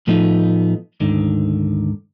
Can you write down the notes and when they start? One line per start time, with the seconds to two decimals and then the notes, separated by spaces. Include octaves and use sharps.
0.07 A2 F3 A3 B3 D#4
1.00 D2 G#2 D3 D#3